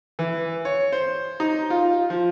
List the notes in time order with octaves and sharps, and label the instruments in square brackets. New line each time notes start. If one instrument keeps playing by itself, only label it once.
[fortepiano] E3
C#5
C5
D#4
F4
F3